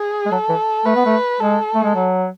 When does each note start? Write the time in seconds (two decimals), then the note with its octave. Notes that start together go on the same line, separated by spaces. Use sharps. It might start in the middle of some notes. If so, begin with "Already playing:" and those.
Already playing: G#4
0.26 G#3
0.31 F#3 A4
0.49 E3
0.85 A3 B4
0.96 B3
1.06 A3
1.40 G#3 A4
1.75 A3
1.84 G#3
1.95 F#3